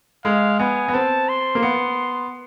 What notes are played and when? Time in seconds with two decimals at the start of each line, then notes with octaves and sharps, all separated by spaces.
0.25 G#3 F5
0.59 B3 G#5
0.88 B3
0.94 C4 A5
1.29 C6
1.55 A#3
1.62 B3